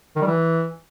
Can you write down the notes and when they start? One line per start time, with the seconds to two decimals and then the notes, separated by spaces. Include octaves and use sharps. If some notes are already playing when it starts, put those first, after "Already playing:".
0.16 D#3
0.21 G3
0.27 E3